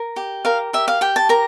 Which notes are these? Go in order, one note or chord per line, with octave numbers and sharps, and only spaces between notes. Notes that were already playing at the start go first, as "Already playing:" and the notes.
Already playing: A#4
G4
A#4 F5
G4 E5
F5
G4 G5
A5
A#4 A#5